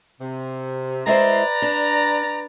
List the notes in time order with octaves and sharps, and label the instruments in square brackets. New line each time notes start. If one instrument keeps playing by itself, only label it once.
[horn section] C3
[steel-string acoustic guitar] G#3 E4 C5 [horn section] B4 D5 A#5
[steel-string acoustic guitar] D4